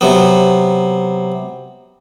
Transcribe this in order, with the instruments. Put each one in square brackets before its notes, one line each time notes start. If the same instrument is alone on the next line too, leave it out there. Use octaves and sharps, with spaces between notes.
[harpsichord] C3 F#3 B3